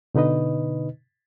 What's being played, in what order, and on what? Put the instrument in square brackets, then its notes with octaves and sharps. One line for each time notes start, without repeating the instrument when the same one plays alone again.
[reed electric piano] B2 D3 D#4 B4 D#5